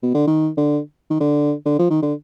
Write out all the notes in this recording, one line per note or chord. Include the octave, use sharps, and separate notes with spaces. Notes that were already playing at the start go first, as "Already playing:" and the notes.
B2
D3
D#3
D3
D#3
D3
D3
F3
D#3
D3